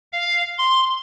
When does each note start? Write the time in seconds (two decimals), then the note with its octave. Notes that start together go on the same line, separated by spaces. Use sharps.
0.13 F5
0.58 C6